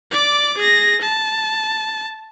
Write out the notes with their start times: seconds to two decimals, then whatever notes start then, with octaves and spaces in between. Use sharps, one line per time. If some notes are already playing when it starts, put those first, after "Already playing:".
0.12 D5 D6
0.57 G#4 A#6
1.01 A5